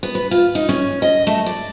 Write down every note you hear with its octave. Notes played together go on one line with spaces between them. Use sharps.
B3
B4
F4
D#4
C#4
D#5
A3
D5